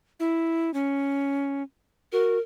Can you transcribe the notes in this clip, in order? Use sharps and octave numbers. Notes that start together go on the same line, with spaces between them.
E4
C#4
F#4 A#4